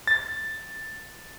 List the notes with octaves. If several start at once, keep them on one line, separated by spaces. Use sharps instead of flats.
A6